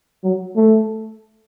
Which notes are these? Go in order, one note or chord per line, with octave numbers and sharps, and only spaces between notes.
F#3
A3